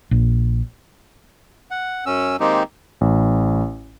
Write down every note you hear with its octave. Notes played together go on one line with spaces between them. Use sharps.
A#1
F#5
F#2 C#4 E6
D#3 G#3 A#3 C4 D#4 G4
A1